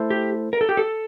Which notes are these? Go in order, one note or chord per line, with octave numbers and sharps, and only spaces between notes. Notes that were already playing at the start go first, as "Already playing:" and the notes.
Already playing: A3 E4 A4 C5
G4
A#4
A4
G4
A4